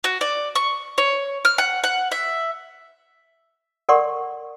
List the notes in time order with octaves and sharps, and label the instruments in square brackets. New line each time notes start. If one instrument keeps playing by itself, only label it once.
[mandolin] F#4
D5
C#6
C#5
F6
F#5
F#5
E5
[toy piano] A4 A#4 D5 F#5 C6 C#6